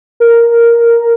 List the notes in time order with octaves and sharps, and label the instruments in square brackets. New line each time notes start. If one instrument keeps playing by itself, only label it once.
[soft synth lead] A#4